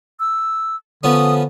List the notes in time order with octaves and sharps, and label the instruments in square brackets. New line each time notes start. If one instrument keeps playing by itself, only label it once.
[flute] E6
[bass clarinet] D3 [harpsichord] F3 B3 C#4 [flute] D#6